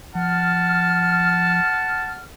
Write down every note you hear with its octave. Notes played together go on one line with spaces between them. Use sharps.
F3 F#5 A5 F6